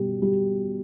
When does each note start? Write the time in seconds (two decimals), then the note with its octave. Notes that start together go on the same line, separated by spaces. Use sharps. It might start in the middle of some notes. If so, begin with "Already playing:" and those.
Already playing: B2 G3
0.22 G3